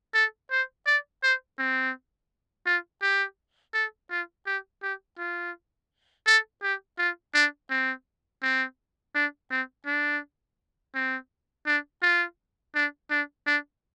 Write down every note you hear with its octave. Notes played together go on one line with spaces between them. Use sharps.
A4
C5
D5
C5
C4
F4
G4
A4
F4
G4
G4
F4
A4
G4
F4
D4
C4
C4
D4
C4
D4
C4
D4
F4
D4
D4
D4